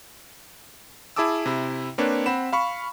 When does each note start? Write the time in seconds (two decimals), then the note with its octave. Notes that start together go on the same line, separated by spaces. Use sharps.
1.16 E4 G#4 A5 D6 E6
1.46 C3 E4
1.98 A#3 C4 D4 B4 C#5
2.26 C4 F#5 B5 E7
2.53 F5 B5 C#6